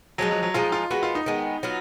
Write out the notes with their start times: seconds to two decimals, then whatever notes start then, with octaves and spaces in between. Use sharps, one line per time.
0.18 F3 F#3 G#3 D#4
0.31 F#3
0.43 F#3
0.54 F3 G#3 D#4 F4
0.72 F4
0.91 D#3 G#3 B3 F#4
1.03 F4
1.15 D#4
1.26 D#3 G#3 B3
1.63 F#3 B3 F4